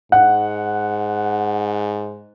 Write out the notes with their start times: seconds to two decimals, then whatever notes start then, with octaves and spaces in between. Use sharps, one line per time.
0.12 G#2 F#5